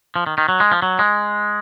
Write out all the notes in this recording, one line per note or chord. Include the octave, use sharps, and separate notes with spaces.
F3
D#3
D#3
F#3
G#3
F3
F#3
G#3